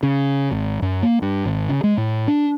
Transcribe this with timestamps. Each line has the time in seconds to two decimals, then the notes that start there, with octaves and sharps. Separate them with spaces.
0.03 C#3
0.51 G#1
0.82 F#2
1.03 A#3
1.22 G2
1.45 G#1
1.69 C#3
1.84 G#3
1.97 A2
2.28 D4